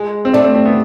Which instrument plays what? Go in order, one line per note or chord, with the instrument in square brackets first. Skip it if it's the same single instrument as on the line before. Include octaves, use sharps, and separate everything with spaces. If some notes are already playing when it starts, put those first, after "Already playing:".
Already playing: [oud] G#3
[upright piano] C4
[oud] A3 [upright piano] D4
[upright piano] C4
C4
B3